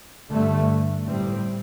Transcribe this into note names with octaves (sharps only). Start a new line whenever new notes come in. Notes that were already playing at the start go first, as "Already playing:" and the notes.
G2 D3 A3
A2 G3 C4